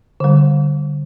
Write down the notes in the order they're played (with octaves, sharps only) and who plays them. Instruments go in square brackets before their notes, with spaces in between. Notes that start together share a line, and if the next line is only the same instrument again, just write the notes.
[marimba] D3 G3